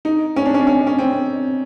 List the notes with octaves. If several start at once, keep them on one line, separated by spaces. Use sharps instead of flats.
D#4
C#4
D4
C#4
D4
C#4
C#4
C4